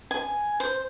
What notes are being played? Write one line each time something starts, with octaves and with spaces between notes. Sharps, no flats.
G#5
C5